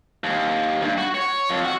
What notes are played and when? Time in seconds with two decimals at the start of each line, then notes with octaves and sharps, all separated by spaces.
0.24 D#2
0.82 G2
0.98 F#4
1.14 C#5
1.49 F2
1.65 F#4